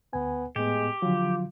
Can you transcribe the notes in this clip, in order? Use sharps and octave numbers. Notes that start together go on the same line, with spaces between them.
D2 B3 G#5
A2 G#3 B3 G4
D3 F3 F#3 F4